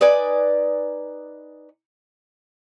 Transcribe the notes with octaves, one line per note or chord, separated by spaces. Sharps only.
D#4 B4 D5 G#5